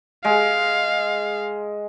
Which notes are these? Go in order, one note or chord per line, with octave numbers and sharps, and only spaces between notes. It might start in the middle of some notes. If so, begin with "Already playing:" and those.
G#3 F5